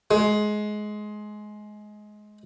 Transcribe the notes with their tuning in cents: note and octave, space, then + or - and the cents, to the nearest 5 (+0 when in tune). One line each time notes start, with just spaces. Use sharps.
G#3 +20